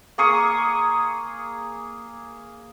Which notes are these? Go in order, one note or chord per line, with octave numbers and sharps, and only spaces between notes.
A#3 G#4 C#6 D#6